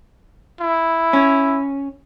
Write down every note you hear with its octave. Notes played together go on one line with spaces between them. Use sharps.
E4
C#4